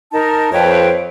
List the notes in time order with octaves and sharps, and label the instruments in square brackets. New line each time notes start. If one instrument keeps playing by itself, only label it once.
[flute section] D#4 A#4 A5
[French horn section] F2 [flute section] B4 C#5 G5